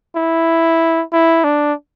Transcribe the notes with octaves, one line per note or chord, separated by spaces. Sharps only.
E4
E4
D4